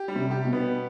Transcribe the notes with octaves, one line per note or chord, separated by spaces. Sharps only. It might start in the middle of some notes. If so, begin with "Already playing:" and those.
Already playing: G4
G3
C3
G4
B2
B3